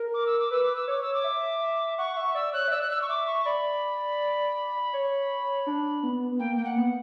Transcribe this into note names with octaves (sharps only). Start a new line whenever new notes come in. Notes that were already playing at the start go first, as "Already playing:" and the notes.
Already playing: A#4
D6
E6
D6
B4 E6
D6
E6
C#5 D6
E6
D6
E5
E5
F#5 C#6
E5 C#6
D5 E6
C#5 F#6
E5
D5 E6
F#6
E6
C#6
E5 D6
C#6
D5 B5
C#5
D4
B3
B3
A#3 G5
A#3 G5
F#5
B3